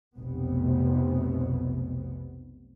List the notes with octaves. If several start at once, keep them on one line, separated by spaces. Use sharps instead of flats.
F1 B1 B2 B3